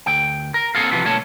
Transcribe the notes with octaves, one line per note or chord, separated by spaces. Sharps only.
D2 G5
A#4
A#3 C4 G#4 A4 F5
C3 E3 F3 B3
B1 D3 A3 A#3 C#5 A5